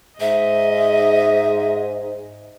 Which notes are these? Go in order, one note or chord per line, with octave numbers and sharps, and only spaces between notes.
G#2 D#5 E5